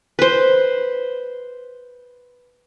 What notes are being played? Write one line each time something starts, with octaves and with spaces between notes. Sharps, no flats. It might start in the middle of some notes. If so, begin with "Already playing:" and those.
B4 C5